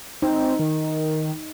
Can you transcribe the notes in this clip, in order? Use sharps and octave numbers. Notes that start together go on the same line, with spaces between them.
C4 D#4
D#3